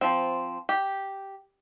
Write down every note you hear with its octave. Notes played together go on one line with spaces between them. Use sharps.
F3 C4
G4